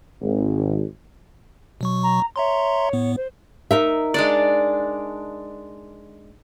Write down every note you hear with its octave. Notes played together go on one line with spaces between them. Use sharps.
G#1
B2 F#3 C#6
A#5
C#5 E5 A#5 C6
A2 B3
C5
D#4 A#4 E5
G#3 D4 D5